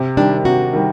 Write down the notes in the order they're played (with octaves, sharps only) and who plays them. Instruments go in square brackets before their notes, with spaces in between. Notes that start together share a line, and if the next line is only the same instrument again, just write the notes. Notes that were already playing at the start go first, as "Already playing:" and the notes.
Already playing: [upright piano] C3
[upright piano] D#3 G3 [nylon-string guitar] D4
[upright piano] C3 [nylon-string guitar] F#4
[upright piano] D#3 G3